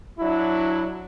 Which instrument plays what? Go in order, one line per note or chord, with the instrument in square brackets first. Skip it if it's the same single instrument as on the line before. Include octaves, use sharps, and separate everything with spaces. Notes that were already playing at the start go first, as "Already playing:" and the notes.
[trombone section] F#3 D4 E4